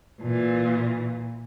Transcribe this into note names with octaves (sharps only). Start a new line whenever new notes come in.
A#2 E3